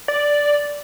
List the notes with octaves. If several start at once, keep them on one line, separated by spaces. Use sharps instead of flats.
D5